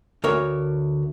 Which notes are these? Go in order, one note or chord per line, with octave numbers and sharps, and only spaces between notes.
D2 A#4 C#5 E5